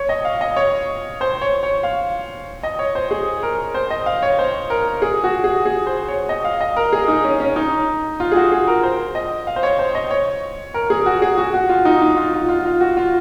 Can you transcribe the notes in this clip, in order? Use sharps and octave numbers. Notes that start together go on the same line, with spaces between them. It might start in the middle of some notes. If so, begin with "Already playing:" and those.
Already playing: C#5
D#5
F5
D#5
C#5
C5
C#5
C#5
F5
D#5
C#5
C5
G#4
A#4
C5
D#5
F5
C#5
C5
A#4
G#4
F#4
G#4
G#4
C5
C#5
D#5
F5
D#5
A#4
G#4
D#4
C#4
C#4
D#4
F4
G#4
F#4
G#4
A#4
C5
D#5
F5
C5
C#5
C5
D#5
C#5
A#4
G#4
F#4
G#4
F#4
F#4
F4
D#4
D#4
F4
F4
F4
F4
F#4
F4